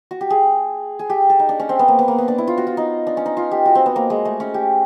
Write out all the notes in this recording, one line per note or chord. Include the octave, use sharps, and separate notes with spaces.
F#4
G4
G#4
G#4
G4
A4
D#4
D4
C#4
C4
B3
A#3
B3
A#3
B3
D4
E4
F4
F#4
F4
D#4
D4
C#4
D#4
F4
G4
F#4
C4
B3
A#3
G#3
A3
C#4
G4